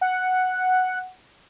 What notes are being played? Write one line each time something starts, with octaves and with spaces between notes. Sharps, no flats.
F#5